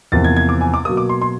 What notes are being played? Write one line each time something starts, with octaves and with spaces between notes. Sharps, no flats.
E2 C3 F3 A#3 A6
G#6
G#6
D6
G#5
D6
B2 F#3 A#3 D#6
D6
C6
C6